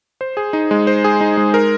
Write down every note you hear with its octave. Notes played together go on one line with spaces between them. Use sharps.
C5
G#4
D#4
G#3
C5
G#4
D#4
G#3
A#4